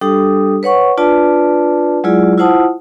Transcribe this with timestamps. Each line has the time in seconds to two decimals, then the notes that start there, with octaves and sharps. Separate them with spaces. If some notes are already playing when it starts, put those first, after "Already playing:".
0.01 G3 D4 G4 A4 D#6
0.63 B4 C#5 F#5 C#6
0.98 D4 F4 B4 D5 A5
2.04 F#3 G#3 E4 F4 G#4 D5
2.38 E4 F4 C5 F#5 A5 D#6